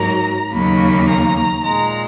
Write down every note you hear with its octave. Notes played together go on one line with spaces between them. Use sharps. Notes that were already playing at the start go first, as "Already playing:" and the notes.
Already playing: G#2 F#3 A#3 A#5
D#2 C#3 F#3 A#3 B5
A#5
A#2 G#3 A#5